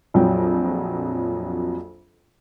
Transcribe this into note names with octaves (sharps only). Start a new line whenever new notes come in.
A#1 F2 F#3 G5